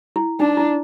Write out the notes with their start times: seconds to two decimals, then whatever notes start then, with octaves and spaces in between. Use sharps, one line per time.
0.16 E4
0.40 D4 D#4
0.57 E4